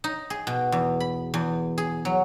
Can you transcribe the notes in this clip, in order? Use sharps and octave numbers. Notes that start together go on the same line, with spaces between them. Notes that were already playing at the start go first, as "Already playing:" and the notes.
D#4
G#4
B2
E2
B5
E2
G#4
F#3